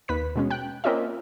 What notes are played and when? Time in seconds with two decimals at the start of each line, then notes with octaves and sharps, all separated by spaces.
0.08 D#2 B4 B6
0.36 B2 G#3 C#4
0.50 G5 F#6
0.84 A#3 C4 C#4 F4 D#5 E5